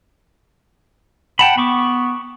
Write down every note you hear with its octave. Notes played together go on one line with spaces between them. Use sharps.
F#5 G5 A5 B5
B3 B5 C#6 D6